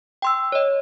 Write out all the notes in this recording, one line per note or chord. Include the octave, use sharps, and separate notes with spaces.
G5 C6 E6
C#5 D#5